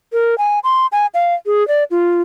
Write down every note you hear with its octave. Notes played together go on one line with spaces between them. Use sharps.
A#4
G#5
C6
G#5
F5
G#4
D5
F4